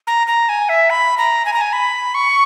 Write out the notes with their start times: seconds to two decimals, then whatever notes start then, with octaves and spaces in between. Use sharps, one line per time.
0.07 A#5
0.27 A#5
0.49 G#5
0.69 E5
0.90 B5
1.18 A#5
1.46 G#5
1.53 A#5
1.61 G#5
1.73 B5
2.15 C#6